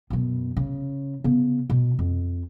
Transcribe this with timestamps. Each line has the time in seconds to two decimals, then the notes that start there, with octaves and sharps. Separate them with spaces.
0.10 F#2 B2
0.57 C#3
1.24 C#3 B3
1.70 B2
1.99 F2